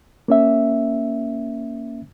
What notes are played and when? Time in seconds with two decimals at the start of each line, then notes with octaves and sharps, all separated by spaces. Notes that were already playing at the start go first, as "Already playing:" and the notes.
0.28 A#3 C#4 E5